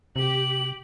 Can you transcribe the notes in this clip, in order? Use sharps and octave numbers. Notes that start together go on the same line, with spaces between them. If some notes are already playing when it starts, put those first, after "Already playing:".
C3 G4 F#7